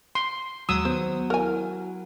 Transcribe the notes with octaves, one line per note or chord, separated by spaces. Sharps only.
C6
D#2 F#3 G#3 D#6 E6
D#3 B3 C5
E4 F#4 A#4 G#5